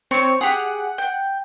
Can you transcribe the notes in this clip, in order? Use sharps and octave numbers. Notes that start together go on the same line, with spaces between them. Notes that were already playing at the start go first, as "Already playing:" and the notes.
C4 C#5
G4 G#4 F#5
G5